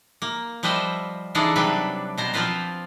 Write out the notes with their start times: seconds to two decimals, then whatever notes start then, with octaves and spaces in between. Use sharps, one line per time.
0.22 A#3
0.63 F3 G3 B4 C5 D#5 E5
1.35 C#3 E3 D4 D#4 G#4 A4
1.56 C3 F#3 G3 D4 B4
2.18 B2 C5 A#5
2.33 F3 C4 F4 B4 C5